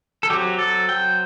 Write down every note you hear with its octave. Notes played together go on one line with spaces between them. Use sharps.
A4
F#3 C4 G4
A4
G5